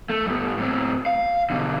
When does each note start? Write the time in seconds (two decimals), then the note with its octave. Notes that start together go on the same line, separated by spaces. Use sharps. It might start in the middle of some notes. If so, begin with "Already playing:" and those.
0.10 A3
0.26 G2 B3
0.58 A2 C4
1.06 F5
1.50 B2 D3